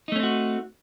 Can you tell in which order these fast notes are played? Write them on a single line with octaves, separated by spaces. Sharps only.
D#4 A3 C#4 C4 F#4